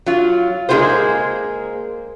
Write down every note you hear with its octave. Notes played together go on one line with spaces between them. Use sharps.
F#3 F4
G#3 A#3 F4 G4 G#4 C5